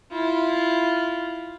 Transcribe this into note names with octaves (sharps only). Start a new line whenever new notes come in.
E4 F4